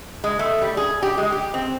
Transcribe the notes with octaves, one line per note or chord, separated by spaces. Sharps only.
G#3
A3
G3
G#4
G4
G#3
G4
C4